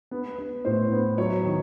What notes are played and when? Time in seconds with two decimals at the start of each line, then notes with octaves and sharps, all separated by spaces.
0.11 B3
0.38 B3
0.65 A2 C5
0.92 B3
1.18 F#3 C#5
1.44 D#3